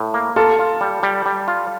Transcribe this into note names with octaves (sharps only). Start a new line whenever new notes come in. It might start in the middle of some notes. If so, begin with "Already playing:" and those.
Already playing: A2
A#3
F4 A4
F4
G3
G3
G3
F4